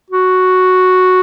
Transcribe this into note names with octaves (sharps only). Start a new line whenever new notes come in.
F#4